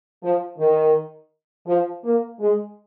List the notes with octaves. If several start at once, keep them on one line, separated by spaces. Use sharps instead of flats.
F3
D#3
F3
A#3
G#3